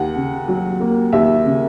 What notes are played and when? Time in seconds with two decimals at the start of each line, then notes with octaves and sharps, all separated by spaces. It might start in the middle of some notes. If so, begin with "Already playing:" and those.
Already playing: D#2 F#5
0.16 C#3
0.48 F#3
0.80 A#3
1.13 D#2 E5
1.45 C#3